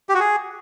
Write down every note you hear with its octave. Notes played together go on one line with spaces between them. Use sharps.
G4
F#4
G#4